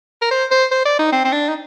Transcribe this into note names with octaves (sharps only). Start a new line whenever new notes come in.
A#4
C5
C5
C5
D5
D#4
C4
C4
D4
D#4